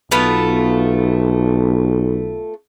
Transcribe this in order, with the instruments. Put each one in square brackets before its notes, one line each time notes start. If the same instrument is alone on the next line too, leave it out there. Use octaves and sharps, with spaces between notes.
[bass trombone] B1 [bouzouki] A3 B3 F4